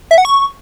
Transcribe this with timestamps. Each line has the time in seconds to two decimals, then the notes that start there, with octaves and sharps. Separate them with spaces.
0.11 E5
0.18 F#5
0.25 C#6